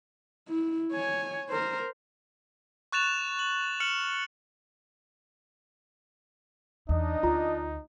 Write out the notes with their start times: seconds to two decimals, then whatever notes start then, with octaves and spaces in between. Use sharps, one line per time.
0.49 E4
0.91 C#5 G#5
1.50 A#4 C5
2.92 C#6 F#6 A6 E7 F7
3.39 F#7
3.80 F6 C#7 E7 F#7
6.89 E2 D4 D#4 D#5
7.23 D2 F4 A#5